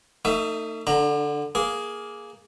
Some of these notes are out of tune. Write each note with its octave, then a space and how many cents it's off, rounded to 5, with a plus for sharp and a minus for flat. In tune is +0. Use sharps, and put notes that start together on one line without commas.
A3 +40 D#4 +0 E5 +5
D3 +0 D4 +35 A#5 +0
A#3 +0 G#4 +0